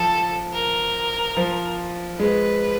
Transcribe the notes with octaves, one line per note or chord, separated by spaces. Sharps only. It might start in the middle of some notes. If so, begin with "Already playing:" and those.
Already playing: F3 A4
A#4
F3
G#3 B4